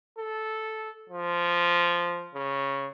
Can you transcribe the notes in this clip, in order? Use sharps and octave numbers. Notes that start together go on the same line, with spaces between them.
A4
F3
C#3